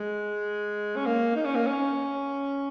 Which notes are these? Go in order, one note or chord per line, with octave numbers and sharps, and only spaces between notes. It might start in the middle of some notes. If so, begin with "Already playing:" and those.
Already playing: G#3
C#4
A#3
D#4
C#4
A#3
C#4